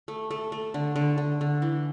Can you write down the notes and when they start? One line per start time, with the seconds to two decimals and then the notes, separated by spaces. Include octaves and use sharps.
0.08 A3
0.31 A3
0.52 A3
0.74 D3
0.96 D3
1.18 D3
1.41 D3
1.62 E3